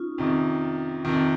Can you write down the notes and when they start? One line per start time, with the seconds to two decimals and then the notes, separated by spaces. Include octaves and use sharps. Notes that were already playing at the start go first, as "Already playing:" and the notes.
Already playing: C#4 D#4 F4
0.18 F2 C3 D#3 D#4
1.05 F2 C3 D#3 F4